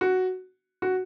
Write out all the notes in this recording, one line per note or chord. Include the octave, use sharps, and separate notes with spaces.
F#4
F#4